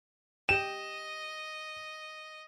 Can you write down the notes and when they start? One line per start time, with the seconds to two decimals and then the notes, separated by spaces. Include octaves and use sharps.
0.49 G4 D#5 G5 E7